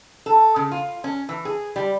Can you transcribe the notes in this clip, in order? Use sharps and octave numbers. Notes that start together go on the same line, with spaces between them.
A4
C#3
F4
C#4
E3
G#4
G3